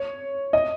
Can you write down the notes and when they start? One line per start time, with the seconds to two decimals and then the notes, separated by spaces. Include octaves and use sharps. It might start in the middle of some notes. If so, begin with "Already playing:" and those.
Already playing: C#5
0.53 D#5